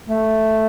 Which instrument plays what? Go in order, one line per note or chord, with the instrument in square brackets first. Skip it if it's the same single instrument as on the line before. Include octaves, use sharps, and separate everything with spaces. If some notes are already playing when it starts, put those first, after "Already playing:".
[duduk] A3